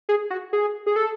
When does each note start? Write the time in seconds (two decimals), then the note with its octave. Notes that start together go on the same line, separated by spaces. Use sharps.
0.09 G#4
0.30 F#4
0.53 G#4
0.86 G#4
0.96 A4